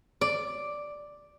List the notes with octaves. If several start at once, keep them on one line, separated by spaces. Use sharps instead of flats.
D5